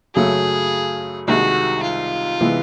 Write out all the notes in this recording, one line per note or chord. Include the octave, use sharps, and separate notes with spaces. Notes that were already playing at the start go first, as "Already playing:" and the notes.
F#2 C#3 F#3 A3 G#4
C2 C3 D#3 G#3 F#4
F4
C3 E3 G#3 B3